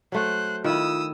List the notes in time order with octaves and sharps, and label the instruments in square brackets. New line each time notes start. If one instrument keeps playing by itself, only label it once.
[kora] F#3 A3 [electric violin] C5 F#6
[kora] D#3 E4 [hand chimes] F4 [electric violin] D#6 E6